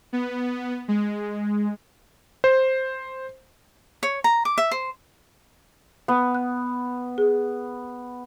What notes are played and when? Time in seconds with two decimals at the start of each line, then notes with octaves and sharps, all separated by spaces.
0.13 B3
0.88 G#3
2.44 C5
4.03 C#5
4.24 A#5
4.45 D6
4.58 E5
4.71 C5
6.08 B3
6.35 F#6
7.18 G#4